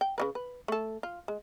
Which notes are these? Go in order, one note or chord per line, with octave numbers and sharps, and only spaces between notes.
G5
C#3 G3 B4
B4
A3 A4
F4
G#3